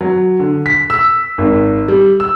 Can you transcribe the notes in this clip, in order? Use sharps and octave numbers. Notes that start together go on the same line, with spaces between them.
F#3
D3
B6
E6
G#1
G3
E6